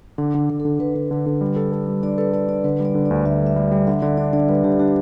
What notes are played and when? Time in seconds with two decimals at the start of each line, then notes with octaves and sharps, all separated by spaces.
0.18 D3 D4
0.35 D3
0.50 D3
0.60 A4
0.65 D3
0.79 D3 B4
0.95 D3
1.11 D3
1.26 D3
1.41 G3
1.56 A4
1.72 A4
1.87 G3
2.03 D4 D5
2.18 A4 B4
2.33 A4 D5
2.49 D4 D5
2.64 D3 B4
2.80 G3 D5
2.95 D3
3.05 D5
3.11 D2
3.26 D2 E5
3.41 G3
3.46 E5
3.56 G3
3.71 G3
3.87 D3 E5
4.02 D3 D5
4.17 D4 D5
4.33 D3 D5
4.49 G3 B4
4.64 D3 G4
4.79 D4 G4